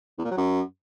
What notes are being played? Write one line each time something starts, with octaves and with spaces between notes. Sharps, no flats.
E2
A#2
F#3
F#2